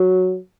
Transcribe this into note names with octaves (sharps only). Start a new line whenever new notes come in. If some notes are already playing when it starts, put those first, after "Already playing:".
Already playing: F#3